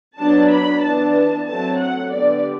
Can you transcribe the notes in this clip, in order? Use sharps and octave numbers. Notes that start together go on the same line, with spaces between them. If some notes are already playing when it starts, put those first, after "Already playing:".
F#3 B3 D4 A5
B5
E3 B3 D4 A5
F#3 A3 C4 A5
F#5
D3 G3 B3 D5